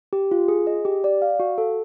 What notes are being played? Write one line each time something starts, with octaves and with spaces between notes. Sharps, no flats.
G4
F4
G#4
D#5
G4
D5
F5
F#4
A4